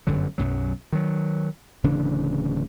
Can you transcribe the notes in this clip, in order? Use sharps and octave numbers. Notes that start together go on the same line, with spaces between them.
G1 F#2 D3 F#3
B1 F#2 F#3
D#3 F#3
D1 C#3 E3 D4